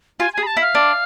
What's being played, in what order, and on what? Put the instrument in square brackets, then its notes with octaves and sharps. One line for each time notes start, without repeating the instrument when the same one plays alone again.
[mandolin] F4 [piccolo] G#5
[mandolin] G#4 [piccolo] G#5
[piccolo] B5
A5
[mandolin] E4
[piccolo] F5
[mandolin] D4